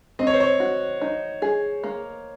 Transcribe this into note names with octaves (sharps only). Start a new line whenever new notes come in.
C4 D#5
C#5
C5
C#5
F#4
D#4
G#4
A#3